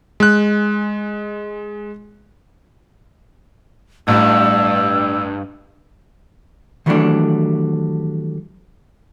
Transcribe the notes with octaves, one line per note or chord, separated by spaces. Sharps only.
G#3 F#6
A1 G2 E6
D#3 E3 F#3 G3 A3 D4